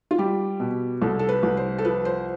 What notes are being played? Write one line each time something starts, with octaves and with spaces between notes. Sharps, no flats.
F4
G3 G4
B2
C2 A4
A4
B4
C2
C5
A4
F3 B4
C5